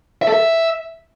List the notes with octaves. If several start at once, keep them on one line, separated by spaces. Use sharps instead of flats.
E5
A4
E5